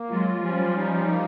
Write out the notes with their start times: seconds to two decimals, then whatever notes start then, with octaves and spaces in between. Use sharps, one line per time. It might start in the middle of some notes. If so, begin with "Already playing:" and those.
Already playing: A#3
0.10 F#3 G#3 F4
0.43 F3 G3 C#4
0.77 D#4
1.10 A#3